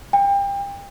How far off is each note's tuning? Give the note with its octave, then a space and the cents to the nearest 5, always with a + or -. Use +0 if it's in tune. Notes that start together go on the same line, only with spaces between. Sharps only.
G5 +30